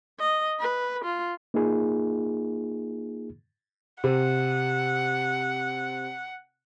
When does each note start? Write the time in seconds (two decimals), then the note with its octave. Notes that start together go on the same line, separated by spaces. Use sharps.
0.20 D#5
0.60 B4
1.05 F4
1.54 A#3 D#4 F4 G#4
4.04 C3 F#5